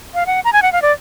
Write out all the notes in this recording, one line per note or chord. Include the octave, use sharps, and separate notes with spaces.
F5
F#5
A#5
G#5
F#5
F5
D5